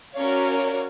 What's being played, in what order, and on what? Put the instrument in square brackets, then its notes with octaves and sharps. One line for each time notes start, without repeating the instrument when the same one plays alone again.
[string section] C#4 F#4 A#4 C#5 D5 F5